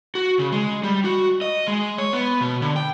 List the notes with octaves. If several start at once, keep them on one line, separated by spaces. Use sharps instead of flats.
F#4
C#3
G#3
G3
F#4
D#5
G#3
C#5
B3
B2
D3
G5